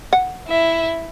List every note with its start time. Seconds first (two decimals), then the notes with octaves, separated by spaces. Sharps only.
0.13 F#5
0.47 E4 E5